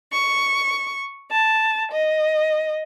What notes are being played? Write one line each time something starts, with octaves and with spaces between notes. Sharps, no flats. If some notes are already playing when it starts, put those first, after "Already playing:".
C#6
A5
D#5